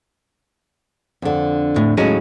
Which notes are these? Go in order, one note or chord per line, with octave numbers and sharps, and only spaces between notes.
F2 D3
A2
D#2 A2 F#3 G#3 C#4